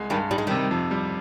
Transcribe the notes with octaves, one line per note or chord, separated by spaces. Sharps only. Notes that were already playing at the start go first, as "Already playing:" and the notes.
Already playing: C2 G#3
G2 D#3 G3
G3 D#4
G#3
C3 D#3 G3
F2
G3